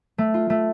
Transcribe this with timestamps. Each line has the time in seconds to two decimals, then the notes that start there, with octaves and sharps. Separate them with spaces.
0.18 A3
0.34 F4
0.50 A3